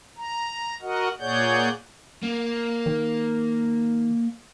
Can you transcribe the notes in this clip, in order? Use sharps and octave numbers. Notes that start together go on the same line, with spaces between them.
A#5
F#4 A#4 D#5 F#5
A#2 G#4 C#5 D5 F#5 G6
A#3
D#3